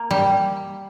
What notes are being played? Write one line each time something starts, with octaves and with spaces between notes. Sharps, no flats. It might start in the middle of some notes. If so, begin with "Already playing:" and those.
Already playing: A#3
G3